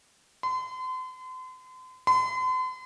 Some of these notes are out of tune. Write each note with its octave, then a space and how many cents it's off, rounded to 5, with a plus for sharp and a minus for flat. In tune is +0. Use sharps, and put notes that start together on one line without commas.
C6 -40
C6 -45